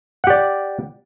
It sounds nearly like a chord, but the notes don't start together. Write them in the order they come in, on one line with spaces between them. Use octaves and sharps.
F#5 G4 D5